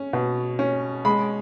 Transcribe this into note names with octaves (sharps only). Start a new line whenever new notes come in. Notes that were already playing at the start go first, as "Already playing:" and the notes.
Already playing: C#4
B2
C#4
G#3 B5